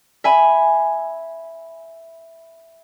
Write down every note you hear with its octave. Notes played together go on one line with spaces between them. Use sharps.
E5 G#5 B5